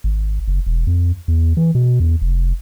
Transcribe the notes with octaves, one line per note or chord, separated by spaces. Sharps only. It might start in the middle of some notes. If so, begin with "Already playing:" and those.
G#1
F#1
E1
F2
E2
E3
B2
E2
F1